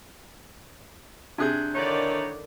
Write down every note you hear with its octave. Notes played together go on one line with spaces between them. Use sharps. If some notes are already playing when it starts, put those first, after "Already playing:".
C3 D4 G#4 F#6 G6
D3 D#3 D#4 E4 C#5 D5